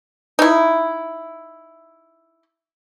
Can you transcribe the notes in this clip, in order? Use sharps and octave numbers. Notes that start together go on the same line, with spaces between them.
D#4 E4